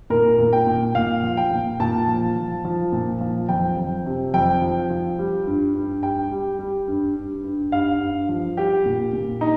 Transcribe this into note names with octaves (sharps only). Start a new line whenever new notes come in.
A#2 A#4
A#2
G5
A#2
A#2 F5
F3
G5
A#2
A#2 A5
F3
F3
F3
A#2
F3
F2 G5
F2
C3
F2 G5
F3
F3
G3
G2
G2
G3 G5
G3
G3
G2
G2
G2
G2 F5
G2
F3
G3 G4
A#2
A#2
D#4